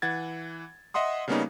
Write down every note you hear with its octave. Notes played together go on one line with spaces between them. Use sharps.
E3 F#5 G#6 A6
D#5 E5 F#5 C6 D#6
C#3 G3 A#3 B3 C#4 D#4